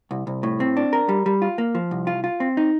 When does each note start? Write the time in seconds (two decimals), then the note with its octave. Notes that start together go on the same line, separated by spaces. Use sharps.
0.11 C2
0.27 C2
0.43 A2
0.60 C4
0.77 D4
0.93 A#4
1.09 G3
1.26 G3
1.42 F4
1.58 A#3
1.75 F3
1.91 C2
2.07 F4
2.24 F4
2.40 C4
2.57 D#4